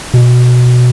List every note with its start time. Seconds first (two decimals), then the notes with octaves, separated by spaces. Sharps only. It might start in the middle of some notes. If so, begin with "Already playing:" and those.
0.14 B2